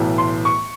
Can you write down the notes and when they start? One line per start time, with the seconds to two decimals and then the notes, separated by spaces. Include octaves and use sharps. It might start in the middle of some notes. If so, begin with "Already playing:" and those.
Already playing: B1 A2 E3 A3
0.18 C6
0.45 C#6